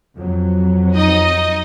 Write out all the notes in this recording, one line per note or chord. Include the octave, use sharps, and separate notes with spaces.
F2 F#3
D#4 D#5